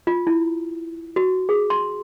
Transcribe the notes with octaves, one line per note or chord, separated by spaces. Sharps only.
F4
E4
F#4
G#4
C6